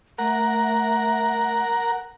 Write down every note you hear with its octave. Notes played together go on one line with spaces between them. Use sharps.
A3 A#4 F#5